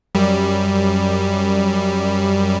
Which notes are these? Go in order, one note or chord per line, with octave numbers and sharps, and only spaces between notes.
F#2 G3